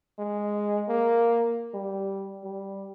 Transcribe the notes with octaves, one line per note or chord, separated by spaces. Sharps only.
G#3
A#3
G3
G3